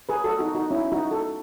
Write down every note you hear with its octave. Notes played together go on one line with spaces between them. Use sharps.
G#4 B4
F#4 A4
D#4 F#4
D#4 F#4
C#4 E4
D#4 F#4
F#4 A4